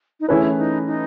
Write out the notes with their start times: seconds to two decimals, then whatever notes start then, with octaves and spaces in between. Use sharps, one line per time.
0.20 D#4
0.28 E3 A3 C#4 E4 G#4 B4
0.58 D#4
0.87 D#4